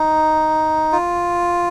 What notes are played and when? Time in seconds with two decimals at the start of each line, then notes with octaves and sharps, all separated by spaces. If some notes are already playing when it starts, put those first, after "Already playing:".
Already playing: D#4
0.92 F4